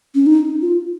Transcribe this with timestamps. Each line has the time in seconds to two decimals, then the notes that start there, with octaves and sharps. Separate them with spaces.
0.15 C#4
0.26 D#4
0.62 F4